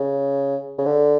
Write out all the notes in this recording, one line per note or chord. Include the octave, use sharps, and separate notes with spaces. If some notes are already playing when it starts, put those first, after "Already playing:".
Already playing: C#3
C#3
D3